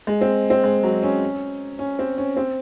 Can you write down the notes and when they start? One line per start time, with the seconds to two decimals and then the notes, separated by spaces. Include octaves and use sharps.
0.07 G#3
0.21 C4
0.50 C4
0.64 G#3
0.83 F#3
1.03 C#4
1.79 C#4
1.99 C4
2.18 C#4
2.37 C4